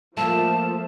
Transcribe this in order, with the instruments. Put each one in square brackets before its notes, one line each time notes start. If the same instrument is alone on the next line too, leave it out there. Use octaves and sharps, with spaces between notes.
[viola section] F3 [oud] A3 A#3 [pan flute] A5